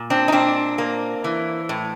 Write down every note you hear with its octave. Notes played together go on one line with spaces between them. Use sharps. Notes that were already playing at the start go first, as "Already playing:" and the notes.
Already playing: A#2
C4 D4
D#4
A#2 C4 D4
A#3
E3
A2